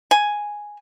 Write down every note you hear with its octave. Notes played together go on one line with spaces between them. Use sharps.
G#5